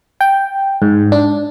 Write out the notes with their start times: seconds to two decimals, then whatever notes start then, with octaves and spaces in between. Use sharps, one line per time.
0.21 G5
0.82 G#2
1.12 D4